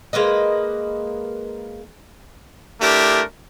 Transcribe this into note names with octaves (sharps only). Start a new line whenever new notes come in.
G#3 A#3 B4 D#5
A3 D4 E4 G4 A#4